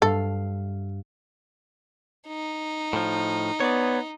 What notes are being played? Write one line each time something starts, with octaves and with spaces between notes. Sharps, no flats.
G2 A4 F5
D#4
A2 F3
B3 C#5 D5